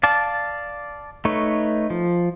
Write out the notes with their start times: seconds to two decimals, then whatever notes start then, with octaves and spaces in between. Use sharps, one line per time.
0.03 D5 F5 A5
1.25 A3 D#4 B4 C#5
1.90 F3